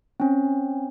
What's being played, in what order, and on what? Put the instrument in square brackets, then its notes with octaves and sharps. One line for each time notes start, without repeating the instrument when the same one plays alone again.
[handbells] C4 C#4